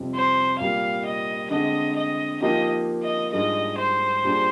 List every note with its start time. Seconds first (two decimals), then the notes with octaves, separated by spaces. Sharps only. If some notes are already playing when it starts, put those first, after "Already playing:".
Already playing: F2 C3 G3 C4
0.15 C5
0.59 A#2 G3 A#3 F5
1.05 D#5
1.50 D3 G#3 C4 D#5
1.96 D#5
2.41 F3 A#3 D#4 G4 D#5
3.03 D#5
3.33 G#2 G3 D4 F4 G#4 D#5
3.78 C5
4.23 A#2 G3 D4 G#4